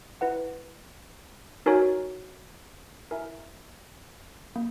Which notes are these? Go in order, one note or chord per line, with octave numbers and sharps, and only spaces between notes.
E4 B4 F#5
D#4 F#4 A#4 C#5 G#5
E4 A#4 E5 G#5
A#3